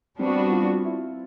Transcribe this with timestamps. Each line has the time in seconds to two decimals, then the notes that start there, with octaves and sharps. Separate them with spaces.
0.19 G3 B3 C4 D4 F#4
0.52 F4
0.85 E4